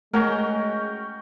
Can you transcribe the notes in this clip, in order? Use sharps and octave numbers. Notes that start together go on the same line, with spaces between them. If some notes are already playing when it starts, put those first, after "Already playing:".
G#3 A3 C#4 F#4 A#4 G5